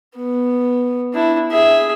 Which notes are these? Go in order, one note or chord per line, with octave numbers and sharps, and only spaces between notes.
B3
D4 E4
G#4 E5